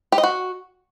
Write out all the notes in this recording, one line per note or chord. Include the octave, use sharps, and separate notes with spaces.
G4
D#5
F#4